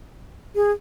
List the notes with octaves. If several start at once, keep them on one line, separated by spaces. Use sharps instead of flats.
G#4